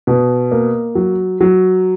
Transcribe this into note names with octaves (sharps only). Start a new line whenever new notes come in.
B2
A#3
F#3
F#3